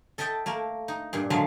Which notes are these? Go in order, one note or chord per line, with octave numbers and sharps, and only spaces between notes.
A4 D#5 E5 G5 A5
A3 A#3 A#4
D#4
G2 A#2
D3 F3 F#3 G#3 E5 F5